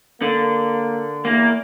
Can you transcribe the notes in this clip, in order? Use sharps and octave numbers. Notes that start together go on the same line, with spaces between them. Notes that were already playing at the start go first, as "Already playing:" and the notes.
D3 A#3
E2 A#3